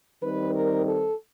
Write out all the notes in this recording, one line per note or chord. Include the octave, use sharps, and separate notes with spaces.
D#3 G3 C4 D#4 B4
A#4
A4